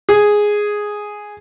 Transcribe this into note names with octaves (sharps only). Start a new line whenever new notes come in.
G#4